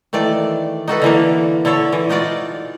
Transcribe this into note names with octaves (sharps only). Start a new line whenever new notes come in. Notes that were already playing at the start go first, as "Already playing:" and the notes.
D#3 E3 A3 D5
D#4 F#4 A4 B4
D3 E3 A#3
D3 E4 A4 C#5
E3
D#4 F4 F#4 D5